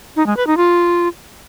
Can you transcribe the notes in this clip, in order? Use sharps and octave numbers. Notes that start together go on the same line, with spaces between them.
D#4
G#3
B4
D#4
F4